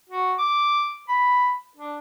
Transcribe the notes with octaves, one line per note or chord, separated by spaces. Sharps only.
F#4
D6
B5
D4